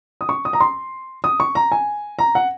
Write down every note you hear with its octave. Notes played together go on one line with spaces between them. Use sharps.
D#6
C#6
D#6
A#5
C6
D#6
C#6
A#5
G#5
A#5
F#5